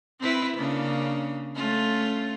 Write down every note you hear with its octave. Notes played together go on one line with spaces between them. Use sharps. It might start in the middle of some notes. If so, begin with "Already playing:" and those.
C4 E4 B4
C#3 A#3 D4
A3 C#4 F4